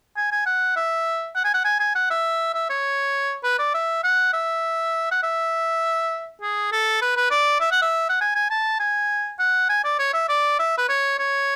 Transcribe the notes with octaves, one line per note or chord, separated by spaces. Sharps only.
G#5
G#5
F#5
E5
F#5
G#5
F#5
G#5
G#5
F#5
E5
E5
C#5
B4
D5
E5
F#5
E5
F#5
E5
G#4
A4
B4
B4
D5
E5
F#5
E5
F#5
G#5
G#5
A5
G#5
F#5
G#5
D5
C#5
E5
D5
E5
B4
C#5
C#5